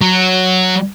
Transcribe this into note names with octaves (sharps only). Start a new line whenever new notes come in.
F#3